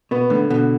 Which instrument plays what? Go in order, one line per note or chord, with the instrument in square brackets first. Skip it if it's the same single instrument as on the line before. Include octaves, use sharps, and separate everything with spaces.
[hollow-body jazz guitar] B2 [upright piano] B3
[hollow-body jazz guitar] A2 [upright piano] D3
[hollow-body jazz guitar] B2 [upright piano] D3